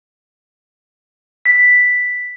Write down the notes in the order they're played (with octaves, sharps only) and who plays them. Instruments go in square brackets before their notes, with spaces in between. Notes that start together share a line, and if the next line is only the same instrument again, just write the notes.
[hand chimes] B6